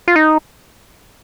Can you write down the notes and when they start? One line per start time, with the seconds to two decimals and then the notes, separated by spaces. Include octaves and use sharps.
0.08 F4
0.16 D#4